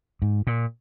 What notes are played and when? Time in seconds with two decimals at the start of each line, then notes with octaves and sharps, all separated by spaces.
0.22 G#2
0.47 A#2